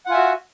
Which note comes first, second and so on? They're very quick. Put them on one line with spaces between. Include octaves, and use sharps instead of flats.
F#5 F4 G#5 E5 F#4